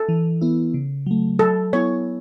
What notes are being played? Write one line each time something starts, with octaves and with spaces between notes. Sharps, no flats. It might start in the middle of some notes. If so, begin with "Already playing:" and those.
Already playing: A4
E3
B3 E4
C#3
F#3 A3
F#3 A4
B3 E4 C#5